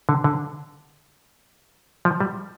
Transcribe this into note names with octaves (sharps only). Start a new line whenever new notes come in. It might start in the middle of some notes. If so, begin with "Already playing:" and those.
D3
D3
F3
G3